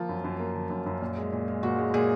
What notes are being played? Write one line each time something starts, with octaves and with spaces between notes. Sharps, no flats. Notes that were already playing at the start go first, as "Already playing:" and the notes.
Already playing: F3 A#3 F4
F#2
F#2
A#3
F3
F#2
F#2
A#2
G#3
A#2
G#3
A#2 F#4
G#3
A#2 G#4